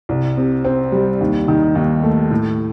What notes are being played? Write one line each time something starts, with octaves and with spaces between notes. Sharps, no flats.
C2
C3
C4
G3
D#2
D#3
D#2
A3
A2